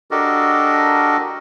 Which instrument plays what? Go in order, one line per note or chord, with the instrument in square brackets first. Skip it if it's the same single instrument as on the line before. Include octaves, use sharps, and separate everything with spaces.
[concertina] D4 F#4 G4 A4 A#4 D#5